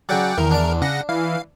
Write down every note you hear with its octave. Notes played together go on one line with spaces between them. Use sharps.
C#3 F#3 D5 F#5 G5
E2 D#3 A#4
D4 D5
C#3 F#5 A#6
E3 F5